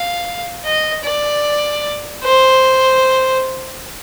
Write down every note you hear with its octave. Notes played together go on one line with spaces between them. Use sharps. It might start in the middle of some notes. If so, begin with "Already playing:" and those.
Already playing: F5
D#5
D5
C5